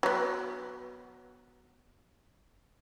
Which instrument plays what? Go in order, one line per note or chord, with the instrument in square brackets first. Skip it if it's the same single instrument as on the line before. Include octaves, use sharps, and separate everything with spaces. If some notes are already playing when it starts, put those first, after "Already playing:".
[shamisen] F#3 B3